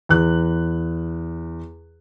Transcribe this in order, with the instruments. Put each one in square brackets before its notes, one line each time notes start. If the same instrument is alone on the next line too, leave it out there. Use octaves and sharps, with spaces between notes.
[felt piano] E2 F#6